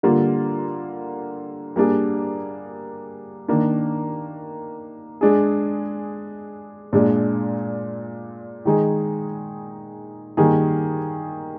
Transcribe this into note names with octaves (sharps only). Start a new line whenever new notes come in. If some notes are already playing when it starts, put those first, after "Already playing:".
D3 G3 A#3 F4
G3 A#3 D4 G#4
D#3 A#3 D4
G#3 D4 G#4
A#2 G#3 D4
D#3 G#3 D#4 G#4
D#3 G3 A#3 D#4 G#4